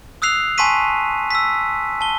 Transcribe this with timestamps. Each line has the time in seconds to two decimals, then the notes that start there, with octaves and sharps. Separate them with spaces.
0.22 D#6 E6 F#6 C7 F7
0.58 G#5 A5 C6 C#6 B6 D#7
1.31 E6 B6
2.01 A5 G7